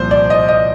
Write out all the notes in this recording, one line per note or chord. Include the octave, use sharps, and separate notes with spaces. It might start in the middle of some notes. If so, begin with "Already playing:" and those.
Already playing: C2 A#2 F3 C5
D5
D#5
D#5